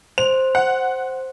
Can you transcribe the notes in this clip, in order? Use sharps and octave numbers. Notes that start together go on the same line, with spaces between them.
C5 F7
F#5